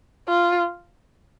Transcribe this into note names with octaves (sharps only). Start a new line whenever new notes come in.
F4